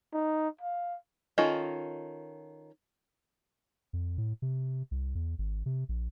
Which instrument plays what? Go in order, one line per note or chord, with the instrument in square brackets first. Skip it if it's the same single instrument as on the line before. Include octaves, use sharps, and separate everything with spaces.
[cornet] D#4
F5
[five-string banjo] D#3 C#4 F4 A4 D#5
[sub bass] F2
A2
C3
C2
E2
G#1
C3
A#1